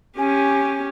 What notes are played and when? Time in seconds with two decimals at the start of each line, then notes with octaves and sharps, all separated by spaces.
0.18 C#4 G4 G#5